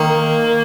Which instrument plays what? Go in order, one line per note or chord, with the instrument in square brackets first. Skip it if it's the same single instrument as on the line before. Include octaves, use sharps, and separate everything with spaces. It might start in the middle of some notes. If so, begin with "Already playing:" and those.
Already playing: [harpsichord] D#3 [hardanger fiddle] A#3